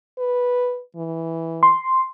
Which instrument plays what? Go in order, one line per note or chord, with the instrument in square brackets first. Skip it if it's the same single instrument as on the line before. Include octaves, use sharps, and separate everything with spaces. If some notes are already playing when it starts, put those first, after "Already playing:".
[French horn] B4
E3
[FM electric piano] C6